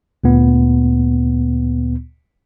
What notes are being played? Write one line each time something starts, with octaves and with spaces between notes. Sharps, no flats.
D2 A#2 B3